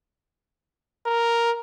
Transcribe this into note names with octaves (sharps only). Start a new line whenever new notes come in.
A#4